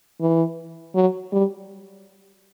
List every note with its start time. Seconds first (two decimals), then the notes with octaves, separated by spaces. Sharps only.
0.20 E3
0.95 F#3
1.32 G3